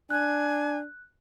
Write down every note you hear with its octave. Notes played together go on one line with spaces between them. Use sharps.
D4 G#5 F#6